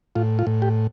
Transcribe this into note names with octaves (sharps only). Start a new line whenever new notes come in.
A2 F4
F4
A2
G4